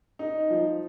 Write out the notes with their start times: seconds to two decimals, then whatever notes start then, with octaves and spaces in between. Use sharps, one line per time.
0.19 D#4
0.50 F3